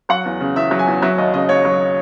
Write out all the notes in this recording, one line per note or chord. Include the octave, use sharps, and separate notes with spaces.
F#3 F#5
E2
C#3
E2 E5
F#3
G#5
E2
F#3 E5
D#2 D#5
C#3 D#5
D#2 C#5
F#3